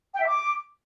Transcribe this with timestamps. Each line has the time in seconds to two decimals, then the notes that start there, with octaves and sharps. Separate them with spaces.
0.13 G5
0.20 E5
0.27 D6